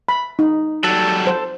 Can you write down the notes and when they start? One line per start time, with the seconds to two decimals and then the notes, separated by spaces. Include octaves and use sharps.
0.09 B5
0.39 D#4
0.84 F#3 G3 A4
1.27 C5